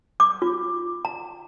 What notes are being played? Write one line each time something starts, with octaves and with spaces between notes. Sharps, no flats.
D6
F4
A#5